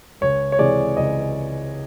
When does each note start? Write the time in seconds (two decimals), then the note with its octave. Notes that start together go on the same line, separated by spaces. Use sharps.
0.21 C#2 C#5
0.52 C#5
0.59 C3 E3 G#3 D5
0.97 C#2 D#5